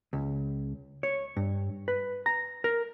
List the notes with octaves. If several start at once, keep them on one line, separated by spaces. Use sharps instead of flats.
C#2
C#5
G2
B4
A#5
A#4